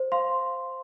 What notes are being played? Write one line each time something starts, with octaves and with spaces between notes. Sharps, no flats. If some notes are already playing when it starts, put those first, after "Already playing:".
Already playing: C5
F5 C6